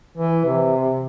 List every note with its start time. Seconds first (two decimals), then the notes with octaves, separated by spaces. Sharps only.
0.17 E3
0.45 C3